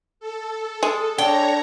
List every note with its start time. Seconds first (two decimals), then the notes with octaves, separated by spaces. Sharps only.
0.20 A4
0.83 G#3
1.18 D4 C#5 G5 A#5